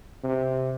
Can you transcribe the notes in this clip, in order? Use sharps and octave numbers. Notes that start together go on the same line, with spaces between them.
C3